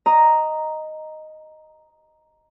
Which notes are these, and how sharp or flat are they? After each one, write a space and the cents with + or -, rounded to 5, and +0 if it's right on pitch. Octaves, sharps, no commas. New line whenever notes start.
D#5 +0 A#5 +0